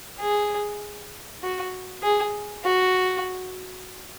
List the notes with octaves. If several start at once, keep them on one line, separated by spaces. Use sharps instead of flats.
G#4
F#4
G#4
F#4